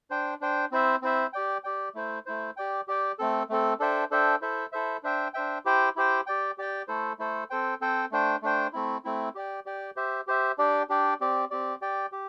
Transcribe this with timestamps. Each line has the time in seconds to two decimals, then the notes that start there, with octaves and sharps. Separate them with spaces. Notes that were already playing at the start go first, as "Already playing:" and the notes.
0.10 D4 C5 G5
0.41 D4 C5 G5
0.71 C4 E4 C5 E5
1.02 C4 E4 C5 E5
1.33 G4 D5 G5
1.64 G4 D5 G5
1.95 A3 E4 C5
2.26 A3 E4 C5
2.57 G4 D5 G5
2.88 G4 D5 G5
3.19 A3 C4 A4
3.49 A3 C4 A4
3.80 D4 A4 C5 E5 G5
4.11 D4 A4 C5 E5 G5
4.41 E4 A4 C5 E5
4.72 E4 A4 C5 E5
5.03 D4 C5 E5 G5
5.34 D4 C5 E5 G5
5.65 E4 G4 C5 G5
5.96 E4 G4 C5 G5
6.27 G4 D5 G5
6.58 G4 D5 G5
6.88 A3 E4 A4 C5
7.19 A3 E4 A4 C5
7.50 C4 A4 C5 G5
7.81 C4 A4 C5 G5
8.11 A3 D4 C5 G5
8.42 A3 D4 C5 G5
8.73 A3 C4 E4
9.05 A3 C4 E4
9.35 G4 D5 G5
9.66 G4 D5 G5
9.96 G4 C5 E5
10.27 G4 C5 E5
10.58 D4 G4 D5 G5
10.89 D4 G4 D5 G5
11.20 C4 G4 D5
11.51 C4 G4 D5
11.81 G4 D5 G5
12.12 G4